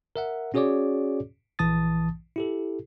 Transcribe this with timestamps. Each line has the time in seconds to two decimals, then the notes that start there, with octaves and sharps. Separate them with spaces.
0.16 A#4 E5 F#5
0.54 C#4 F#4 G#4 C#5 D5 D6
1.59 A#1 E3 A5 D#6 A6
2.36 E4 G4 A4